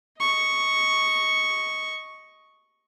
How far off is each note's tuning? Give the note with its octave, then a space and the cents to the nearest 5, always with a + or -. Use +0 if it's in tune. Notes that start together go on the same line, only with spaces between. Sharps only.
D#5 +10 C#6 +0